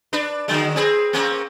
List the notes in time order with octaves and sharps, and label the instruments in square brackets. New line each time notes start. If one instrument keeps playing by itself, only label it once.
[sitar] D4 B4
D3 F#3 G#3
C4 G#4 B4
A#3 C4 C#4